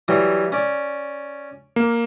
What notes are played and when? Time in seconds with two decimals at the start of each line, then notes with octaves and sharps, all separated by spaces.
0.08 E3 F#3 G3
0.52 C#4 D5
1.76 A#3